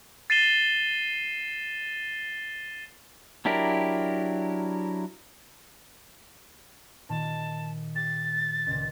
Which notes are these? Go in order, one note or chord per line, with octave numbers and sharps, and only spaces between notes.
A6 C7 D#7 E7 G7
F#3 D4 E4 G4 A#4
A#2 D#3 A5 A#6
G4 A6 C7
C#2 A#2